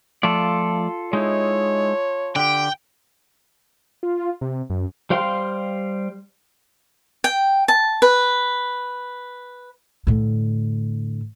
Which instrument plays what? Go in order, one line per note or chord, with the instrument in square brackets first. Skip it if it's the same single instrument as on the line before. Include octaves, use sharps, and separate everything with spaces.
[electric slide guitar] F3 A3 D5 [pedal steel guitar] F4 A4
[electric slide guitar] G#3 D#4 E4 [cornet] C#5
[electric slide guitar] D3 G4 [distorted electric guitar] G5
[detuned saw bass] F4
C3
F#2
[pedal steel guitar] G3 C5 F5 G5 C6
[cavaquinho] G5
A5
B4
[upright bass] A2 D3